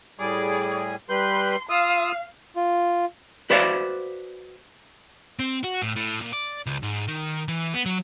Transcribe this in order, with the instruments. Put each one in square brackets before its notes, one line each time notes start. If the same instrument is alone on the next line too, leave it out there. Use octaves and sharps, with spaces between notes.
[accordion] A2 G3 G#4 [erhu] D5
[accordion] G3 B4 G6 [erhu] C6
[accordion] F4 D#6 E6 [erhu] F5
[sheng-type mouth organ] F4
[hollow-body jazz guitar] F#4 B4 C5 D5 E5 F5
[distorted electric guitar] C4
F#4
A2
A2
A#2
D5
C#2
G#2
D#3
E3
B3
F#3